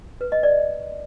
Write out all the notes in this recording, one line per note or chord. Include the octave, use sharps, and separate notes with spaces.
B4
D#5
D5